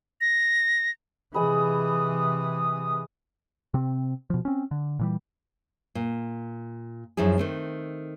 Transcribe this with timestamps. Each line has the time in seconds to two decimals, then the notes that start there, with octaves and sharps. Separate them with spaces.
0.21 A#6
1.34 C3 E3 G#3 B5 D#6
3.74 C3 C4
4.30 B2 F3
4.45 C4 C#4
4.71 D3
4.99 A#2 E3 G3
5.95 A#2
7.17 F#2 F3 D#4 E4 G#4
7.38 D#3 A3 C4